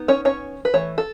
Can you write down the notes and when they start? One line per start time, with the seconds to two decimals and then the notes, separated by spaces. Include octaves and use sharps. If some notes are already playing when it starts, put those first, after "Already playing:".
Already playing: B3 D#4
0.08 C#4 C#5
0.25 C#4 C#5
0.65 B4
0.74 E3 A3 C#5
0.98 A4